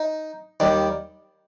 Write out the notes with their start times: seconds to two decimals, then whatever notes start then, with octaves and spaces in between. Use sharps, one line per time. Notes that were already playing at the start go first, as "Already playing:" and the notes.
Already playing: D#4
0.60 D#2 D#3 G3